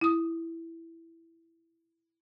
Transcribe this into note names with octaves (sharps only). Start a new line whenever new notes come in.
E4 D#6